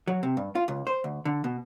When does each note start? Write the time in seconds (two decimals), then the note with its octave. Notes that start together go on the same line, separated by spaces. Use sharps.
0.07 F#3
0.23 C3
0.37 G2
0.55 F4
0.68 C#2
0.87 C5
1.04 D2
1.25 D3
1.44 B2